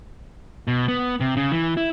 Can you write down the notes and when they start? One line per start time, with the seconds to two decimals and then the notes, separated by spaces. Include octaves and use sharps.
0.67 B2
0.88 B3
1.20 C3
1.37 C#3
1.51 E3
1.77 E4